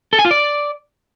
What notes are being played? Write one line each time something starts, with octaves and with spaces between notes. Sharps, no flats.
A4
G#5
F4
D5